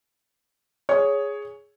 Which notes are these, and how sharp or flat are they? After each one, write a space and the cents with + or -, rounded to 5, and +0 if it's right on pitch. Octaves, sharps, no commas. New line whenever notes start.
G#4 +0 C#5 +10